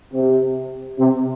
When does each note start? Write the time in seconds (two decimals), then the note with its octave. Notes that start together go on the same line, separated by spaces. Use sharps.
0.14 C3
0.99 C3